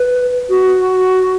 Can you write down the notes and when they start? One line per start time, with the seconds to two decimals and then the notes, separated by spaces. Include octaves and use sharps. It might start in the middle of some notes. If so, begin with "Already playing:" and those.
Already playing: B4
0.50 F#4